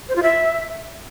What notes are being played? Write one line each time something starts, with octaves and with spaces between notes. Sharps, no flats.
C5
F4
E5